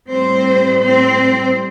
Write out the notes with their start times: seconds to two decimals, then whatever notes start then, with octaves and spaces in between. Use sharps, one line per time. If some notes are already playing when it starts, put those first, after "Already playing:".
0.12 A2 G3 C4 C5
0.83 C4 C5